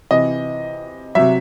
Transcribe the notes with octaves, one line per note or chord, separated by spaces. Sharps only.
C3 E3 D#5
C3 F#3 E5